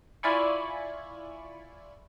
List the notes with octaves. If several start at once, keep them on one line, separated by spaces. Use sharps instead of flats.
E4 F4 D5 G#5 B5 C#6